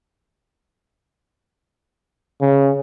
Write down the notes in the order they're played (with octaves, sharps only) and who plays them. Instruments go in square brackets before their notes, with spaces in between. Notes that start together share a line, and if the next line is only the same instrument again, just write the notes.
[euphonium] C#3